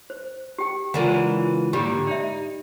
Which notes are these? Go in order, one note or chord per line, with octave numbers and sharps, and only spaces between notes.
C5
G4 G5
C#3 E3 G#3 D4 F4 A#4 F#5
G#2 D3 G3 A#3 G4
D#4 D5 E5